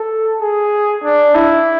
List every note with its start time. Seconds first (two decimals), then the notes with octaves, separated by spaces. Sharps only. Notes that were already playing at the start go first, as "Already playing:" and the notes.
Already playing: A4
0.41 G#4
1.03 D4
1.35 E4